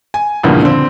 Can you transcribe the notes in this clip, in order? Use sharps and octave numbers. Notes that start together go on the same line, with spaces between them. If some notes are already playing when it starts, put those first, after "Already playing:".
G#5
E2 G2 A#2 C#3 E3 F3
D3 C4